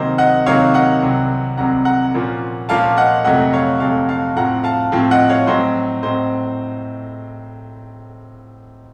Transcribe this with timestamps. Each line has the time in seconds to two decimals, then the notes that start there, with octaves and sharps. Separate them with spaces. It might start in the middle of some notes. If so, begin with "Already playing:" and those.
Already playing: C3 D#3 F#3 A#3 C5 D#5
0.18 D#5 F#5
0.46 C3 D#3 F#3 A#3 C#5 F5
0.74 D#5 F#5
1.02 C2 C3 F#3 C4
1.57 C2 C3 F#3 C4 F#5 A#5
1.85 F#5 A#5
2.14 A#2 F3 A#3 C#4
2.69 A#2 F3 A#3 C#4 F5 A5
2.97 D#5 F#5
3.24 F2 C3 F#3 A3 D#5 F#5
3.53 C#5 F5
3.80 F2 C3 F#3 A3 F5 A5
4.09 F5 A5
4.36 A2 F3 C4 F#5 A#5
4.64 F5 A5
4.92 A2 F3 C4
5.11 D#5 F#5
5.29 C#5 F5
5.47 A2 F#3 C4 C5 D#5
6.03 A2 F#3 C4 C5 D#5